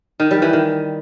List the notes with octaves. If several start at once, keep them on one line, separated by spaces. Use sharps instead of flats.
D#3
G3
E3
D#3